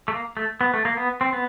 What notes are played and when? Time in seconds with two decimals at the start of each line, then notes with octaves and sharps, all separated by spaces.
0.08 A3
0.13 A#3
0.37 A3
0.61 B3
0.74 A3
0.85 A#3
0.97 B3
1.21 C4
1.33 B3